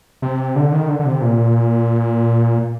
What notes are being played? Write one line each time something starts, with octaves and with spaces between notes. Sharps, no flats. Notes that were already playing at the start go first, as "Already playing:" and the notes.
C3
D3
D#3
D3
D3
C3
A#2